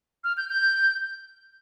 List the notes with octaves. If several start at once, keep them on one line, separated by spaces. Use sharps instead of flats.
F6
G6
G6